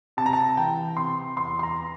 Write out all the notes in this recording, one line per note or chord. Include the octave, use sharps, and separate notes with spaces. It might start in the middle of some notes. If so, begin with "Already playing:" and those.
C3 A5
A#5
A5
E3 G5
C3 C6
E2 C6
C6
A#5